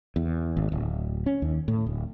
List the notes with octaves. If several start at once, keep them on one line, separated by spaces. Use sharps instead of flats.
E2
G#1
D1
C#4
D#2
A2
D1